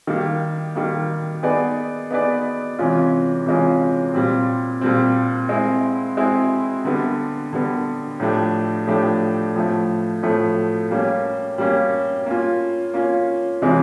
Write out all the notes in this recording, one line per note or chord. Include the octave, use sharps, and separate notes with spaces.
D#3 G3 A#3
D#3 G3 A#3
B3 D#4 G#4 B4 D5
B3 D#4 G#4 B4 D5
C3 E3 G#3 C#4 F4
C3 E3 G#3 C#4 F4
A#2 G3 C4
A#2 G3 C4
G#3 C4 E4
G#3 C4 E4
D3 G3 B3
D3 G3 B3
A2 F3 A3 D4 G4
A2 F3 A3 D4 G4
A2 F3 A3
A2 F3 A3
G3 A#3 C#4
G3 A#3 C#4
A#3 C#4 F4
A#3 C#4 F4
C3 E3 G#3 C#4 F4